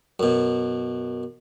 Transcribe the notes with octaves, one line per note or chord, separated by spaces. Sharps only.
F#2 B2